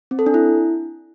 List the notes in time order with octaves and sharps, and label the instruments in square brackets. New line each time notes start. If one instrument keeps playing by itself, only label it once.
[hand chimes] C4
A4
D4
E4